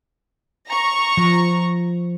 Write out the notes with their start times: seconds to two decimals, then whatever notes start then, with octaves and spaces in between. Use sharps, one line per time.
0.67 A#5 C#6
1.17 F3